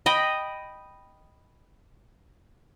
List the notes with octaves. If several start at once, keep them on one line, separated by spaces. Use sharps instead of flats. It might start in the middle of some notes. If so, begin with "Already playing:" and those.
D#5 G5 B5